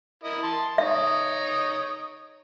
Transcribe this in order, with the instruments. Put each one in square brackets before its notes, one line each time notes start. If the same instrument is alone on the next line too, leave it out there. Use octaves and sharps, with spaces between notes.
[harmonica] E4 A#4 D#5
A5 C6
[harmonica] D#4 C#5 D#6 [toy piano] E5